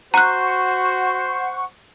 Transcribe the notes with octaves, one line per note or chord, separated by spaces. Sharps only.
F#4 C5 F#5 A#5 C#6 F#6